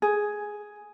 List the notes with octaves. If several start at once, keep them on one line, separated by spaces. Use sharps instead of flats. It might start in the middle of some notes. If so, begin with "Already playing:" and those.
G#4